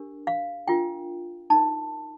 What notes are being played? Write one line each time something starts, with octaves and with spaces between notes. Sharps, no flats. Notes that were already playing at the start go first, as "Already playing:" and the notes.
Already playing: D4 G4 A#4
F5
D4 F4 A#4 G5
D#4 A#4 A5